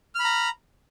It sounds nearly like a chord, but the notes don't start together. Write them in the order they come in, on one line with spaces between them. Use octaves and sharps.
F6 B5 A#5